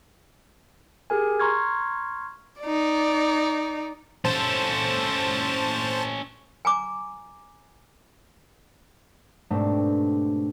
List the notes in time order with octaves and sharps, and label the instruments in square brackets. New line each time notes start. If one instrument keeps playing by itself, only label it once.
[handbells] G4 G#4 A#4 G#5
A#5 C6 C#6 F6 G#6
[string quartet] D#4 D5
[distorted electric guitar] C#4 A4 [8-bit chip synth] C5 A5
[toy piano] G#5 A#5 D6
[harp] G#2 B2 A3 C4 D4 G4